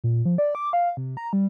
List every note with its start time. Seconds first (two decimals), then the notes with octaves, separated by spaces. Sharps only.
0.04 A#2
0.25 F3
0.38 D5
0.55 D6
0.73 F5
0.97 C3
1.17 A#5
1.33 G3